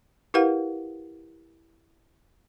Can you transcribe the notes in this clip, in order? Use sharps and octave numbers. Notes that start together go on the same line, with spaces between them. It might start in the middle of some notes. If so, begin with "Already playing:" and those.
E4 G4 A#4 B4 F5 F#5